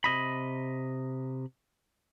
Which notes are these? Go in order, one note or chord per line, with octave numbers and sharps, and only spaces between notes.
C3 D#5 B5